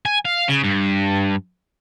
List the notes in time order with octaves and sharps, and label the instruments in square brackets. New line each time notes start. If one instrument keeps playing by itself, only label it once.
[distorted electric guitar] G#5
F5
C#3
G2